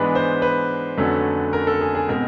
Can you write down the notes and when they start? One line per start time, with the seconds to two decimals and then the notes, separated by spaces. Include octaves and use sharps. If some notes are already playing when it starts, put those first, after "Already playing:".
Already playing: G#2 E3 G#3 B3 D4 B4
0.15 C5
0.42 B4
0.97 F2 D3 F#3 A3 C#4
1.53 A#4
1.67 A4
1.81 G#4
1.95 G#4
2.09 B2 G#3 C4 A#4